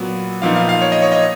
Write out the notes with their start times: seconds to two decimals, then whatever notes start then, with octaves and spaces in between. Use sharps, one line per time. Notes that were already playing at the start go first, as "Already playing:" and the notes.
Already playing: A#2 F#3 B3
0.42 A#2 F3 B3 D#4 F5
0.56 F5
0.69 F5
0.82 C#5
0.92 D#5
1.02 C#5
1.12 D#5